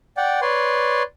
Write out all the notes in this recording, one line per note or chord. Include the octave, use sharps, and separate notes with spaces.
D5 F#5 G5
B4 C#5 D5 C6